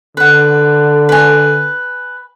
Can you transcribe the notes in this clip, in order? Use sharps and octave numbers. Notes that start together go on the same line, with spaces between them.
D3 B4 F#5
B4 G#5